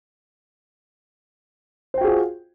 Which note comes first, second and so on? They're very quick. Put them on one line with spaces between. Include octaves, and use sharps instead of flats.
C5 G5 F#4 G#4 F4